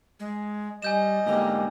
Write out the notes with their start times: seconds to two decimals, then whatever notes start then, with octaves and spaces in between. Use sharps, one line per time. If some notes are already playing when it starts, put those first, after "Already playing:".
0.20 G#3
0.82 G3 D#5 G#5 G6 E7
1.26 G#2 D3 A#3 G4